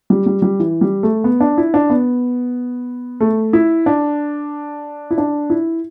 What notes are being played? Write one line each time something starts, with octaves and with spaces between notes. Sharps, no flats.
G3
G3
G3
E3
G3
A3
B3
D4
E4
D4
B3
A3
E4
D4
E4
D4
E4